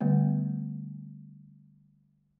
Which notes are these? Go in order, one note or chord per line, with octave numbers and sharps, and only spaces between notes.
D3 G3 A3 B3